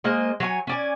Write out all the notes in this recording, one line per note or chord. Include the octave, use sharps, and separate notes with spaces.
G#3 A#3 C5 D#5
F#3 C#5 F#5 G#5
C#4 D5 G#5